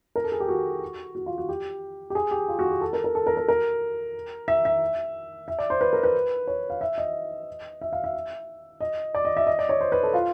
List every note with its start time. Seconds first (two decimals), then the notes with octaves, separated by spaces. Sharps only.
0.16 A#4
0.24 A4
0.32 G#4
0.40 G4
0.49 F#4
1.15 F#4
1.26 F4
1.38 F#4
1.49 G4
2.10 G4
2.15 G#4
2.31 G4
2.48 F4
2.59 F#4
2.71 G4
2.81 A4
2.93 A#4
3.04 A#4
3.15 A4
3.27 A#4
3.37 A#4
3.48 A#4
4.48 E5
4.65 E5
5.48 E5
5.59 D5
5.70 C5
5.81 B4
5.93 A#4
6.03 B4
6.47 C#5
6.70 F5
6.81 E5
6.98 D#5
7.81 E5
7.93 F5
8.04 E5
8.80 D#5
9.15 D5
9.25 D#5
9.37 E5
9.47 D#5
9.59 D5
9.69 C#5
9.81 C5
9.92 B4
10.03 A4
10.14 F4